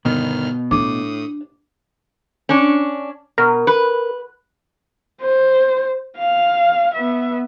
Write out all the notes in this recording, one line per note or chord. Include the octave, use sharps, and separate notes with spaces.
G1 B2 D#3 B3 F6
A2 D4 D6 D#6
C#4 D4
B2 A#4
B4
C5
F5
B3 E5